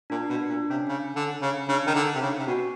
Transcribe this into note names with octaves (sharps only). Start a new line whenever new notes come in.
A#2 D4
B2 D4
A#2 D4
C3 C#4
C#3
D3
C#3
C#3 D4
D#3 D#4
D3
C3
C#3
C#4
C3
B2 F#4